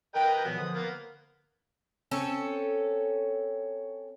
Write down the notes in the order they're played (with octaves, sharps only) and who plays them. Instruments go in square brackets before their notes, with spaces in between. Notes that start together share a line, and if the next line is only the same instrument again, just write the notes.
[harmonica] A#4 B4 D#5 [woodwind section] G5
[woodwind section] A#2 E3 F#3 [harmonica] B3 F#4
[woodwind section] D3 F3 [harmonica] D#6
[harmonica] A#3 B3
[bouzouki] C4 C#4 A4 C#5